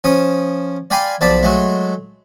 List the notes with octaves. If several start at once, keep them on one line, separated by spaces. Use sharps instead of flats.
F3 C#4 D#6
D5 F5 G5 G#5 B5 C6
B1 F3 D5 A5 B5
F#3 G#3 A3